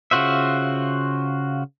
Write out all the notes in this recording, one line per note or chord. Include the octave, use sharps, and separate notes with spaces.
C#3 F4 F#4 C5 E5